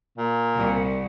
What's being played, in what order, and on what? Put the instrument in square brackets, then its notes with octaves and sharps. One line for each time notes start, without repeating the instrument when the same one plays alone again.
[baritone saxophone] A#2
[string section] C2